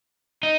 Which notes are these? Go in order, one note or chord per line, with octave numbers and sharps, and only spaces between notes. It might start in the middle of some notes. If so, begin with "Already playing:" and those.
D#4